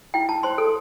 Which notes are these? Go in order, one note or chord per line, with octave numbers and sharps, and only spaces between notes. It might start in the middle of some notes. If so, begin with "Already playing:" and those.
E4 G5
E4 A5
C5 C6
A4